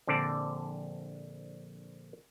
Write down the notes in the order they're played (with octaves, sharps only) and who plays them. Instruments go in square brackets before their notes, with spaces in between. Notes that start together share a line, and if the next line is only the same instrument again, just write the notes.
[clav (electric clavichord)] A#1 D3 C4 D5 A5